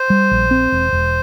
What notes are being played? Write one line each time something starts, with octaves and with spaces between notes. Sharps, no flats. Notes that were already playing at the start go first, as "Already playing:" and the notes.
Already playing: C5
G3
A#1
C4
E1
E1